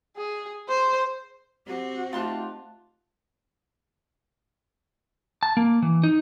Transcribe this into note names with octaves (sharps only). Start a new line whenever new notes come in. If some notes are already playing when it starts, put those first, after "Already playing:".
G#4
C5
C4 F#4 G4
A3 D#4 F4 G4 A5 C6 F#6
A5
A#3
E3
D#4